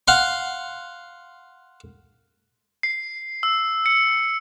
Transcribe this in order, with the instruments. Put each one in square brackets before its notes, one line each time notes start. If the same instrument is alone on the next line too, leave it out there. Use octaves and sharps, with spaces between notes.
[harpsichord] F5 F#5 C6
[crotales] C7
E6
C#7